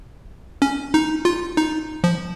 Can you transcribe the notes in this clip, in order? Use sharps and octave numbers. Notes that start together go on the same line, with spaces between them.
C#4
D#4
F4
D#4
F3